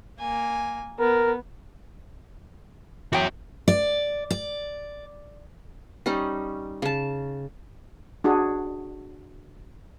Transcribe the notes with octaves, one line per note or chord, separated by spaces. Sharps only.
A#3 G#5
B3 A#4
E2 C#4 F#4 G5
D5
D5
G3 C#4 D#4
C#3 A5
D4 F#4 G#4